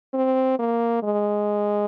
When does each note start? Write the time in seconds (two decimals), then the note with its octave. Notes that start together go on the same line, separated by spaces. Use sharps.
0.14 C4
0.59 A#3
1.03 G#3